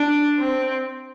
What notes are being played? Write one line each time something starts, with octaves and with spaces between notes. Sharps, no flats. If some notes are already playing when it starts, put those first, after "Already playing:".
Already playing: D4
C4